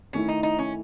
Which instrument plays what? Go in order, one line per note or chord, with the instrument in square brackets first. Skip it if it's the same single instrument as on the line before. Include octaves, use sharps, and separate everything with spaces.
[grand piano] D#3 A3 E4 [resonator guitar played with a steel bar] C#4
[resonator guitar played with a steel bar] D#4
D#4
C#4